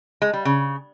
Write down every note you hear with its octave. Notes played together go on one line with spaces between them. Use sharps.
G#3
G3
C#3